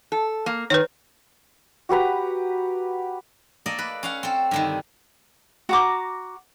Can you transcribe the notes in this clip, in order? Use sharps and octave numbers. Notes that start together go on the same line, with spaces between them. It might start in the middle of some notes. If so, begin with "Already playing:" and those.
A4
A#3
D#3 B4 C#5
F#4 G4 B4 A#5
A#3 A4 D5 D#5
B4
C#4 F5 F#5
C4 A4
G2 D3 D#3
F#4 A#5 D6